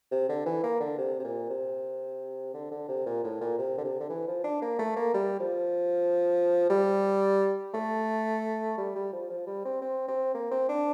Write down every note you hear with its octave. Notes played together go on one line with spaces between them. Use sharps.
C3
D3
E3
A#3
D3
C3
C3
A#2
C3
D3
D3
C3
A#2
A2
A#2
C3
D3
C3
D3
E3
F3
D4
A#3
A3
A#3
G3
F3
G3
A3
G3
G3
F3
F3
G3
C4
C4
C4
A#3
C4
D4